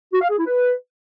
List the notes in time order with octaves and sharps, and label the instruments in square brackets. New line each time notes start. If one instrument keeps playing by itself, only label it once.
[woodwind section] F#4
F5
G#4
E4
B4